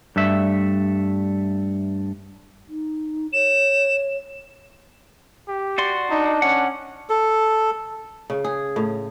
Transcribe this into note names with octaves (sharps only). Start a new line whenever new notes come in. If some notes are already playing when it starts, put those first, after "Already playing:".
G2 A3 E5
D#4
C#5 E7
G4
F#4 D5 C6
D4 D#4
C#4 F#5
A4
C#3
G#4
A2